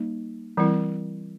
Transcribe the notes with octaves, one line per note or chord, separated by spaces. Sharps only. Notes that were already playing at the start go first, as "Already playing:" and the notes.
Already playing: G3 A#3 D#4
E3 G3 C4 E4